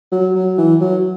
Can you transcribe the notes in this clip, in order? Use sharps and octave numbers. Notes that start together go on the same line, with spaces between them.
F#3
F#3
E3
F#3